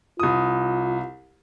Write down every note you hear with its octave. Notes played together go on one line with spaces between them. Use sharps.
C2 F4 D#6